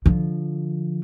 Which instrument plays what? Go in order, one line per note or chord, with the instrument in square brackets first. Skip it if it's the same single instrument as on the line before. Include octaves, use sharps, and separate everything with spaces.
[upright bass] D3 F3